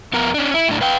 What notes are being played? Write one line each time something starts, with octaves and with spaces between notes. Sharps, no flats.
F2 B3 A#4
C#4 D4
E4
A2 D4
B4 F5 G5